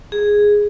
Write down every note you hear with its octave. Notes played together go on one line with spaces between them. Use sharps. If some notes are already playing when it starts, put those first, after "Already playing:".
G#4